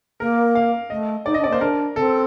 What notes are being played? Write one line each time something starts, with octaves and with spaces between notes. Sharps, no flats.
A#3 A#4
F5
A3 D#5
D#4 D5
D#5
D4
C4 D5
A#3
C5
D4 A#4
C4 A4